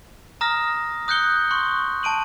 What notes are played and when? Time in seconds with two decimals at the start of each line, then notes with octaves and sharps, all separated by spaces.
0.41 A#5 D#6 F6 A#6
1.08 D#6 F#6 G6 C#7 G7
1.51 C6 C#6 F#6
2.03 A5 D7 D#7 F#7